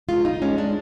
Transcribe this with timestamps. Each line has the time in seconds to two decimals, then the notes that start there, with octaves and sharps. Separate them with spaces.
0.09 G#3 F4
0.25 D2 D#4
0.42 G#3 C#4
0.58 G#3 D4